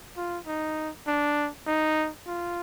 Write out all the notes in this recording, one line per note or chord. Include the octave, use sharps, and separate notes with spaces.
F4
D#4
D4
D#4
F4